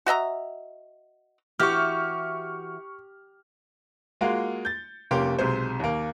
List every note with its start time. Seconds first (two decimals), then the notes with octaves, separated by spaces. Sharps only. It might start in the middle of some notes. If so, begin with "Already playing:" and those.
0.06 F#4 D#5 E5 A#5
1.60 E3 F#4 G4 E5 C#6 F6
4.21 G#3 A#3 F4 F#4
4.65 G6 A6
5.11 F1 A#3 C#4 G4 C6
5.39 B1 C3 G#3 C5
5.80 D#2 A#3